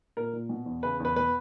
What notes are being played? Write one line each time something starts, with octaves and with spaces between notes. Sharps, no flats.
A#2 A#4
A#2
B2
E2
C#3 B4
E2 B4
B2 B4